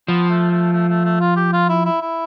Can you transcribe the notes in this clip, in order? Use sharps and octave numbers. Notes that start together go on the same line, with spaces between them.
F3 B3
A3
A3
A3
A3
A3
F4
G4
F4
E4
E4
E4